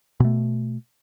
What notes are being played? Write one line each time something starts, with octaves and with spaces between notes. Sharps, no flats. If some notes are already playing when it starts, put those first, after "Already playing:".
B2 A3